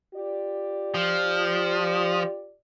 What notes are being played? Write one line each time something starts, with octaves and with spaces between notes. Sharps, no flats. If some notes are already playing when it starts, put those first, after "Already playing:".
F4 G4 D5
F3